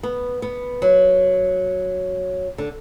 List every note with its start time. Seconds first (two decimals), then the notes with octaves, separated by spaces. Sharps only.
0.03 B3
0.42 B3
0.82 F#3
2.58 D3